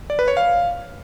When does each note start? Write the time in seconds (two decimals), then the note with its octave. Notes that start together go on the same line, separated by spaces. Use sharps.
0.10 D5
0.19 B4
0.28 C#5
0.37 F5